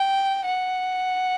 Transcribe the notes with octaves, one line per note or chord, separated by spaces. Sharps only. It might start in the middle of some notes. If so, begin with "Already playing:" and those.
Already playing: G5
F#5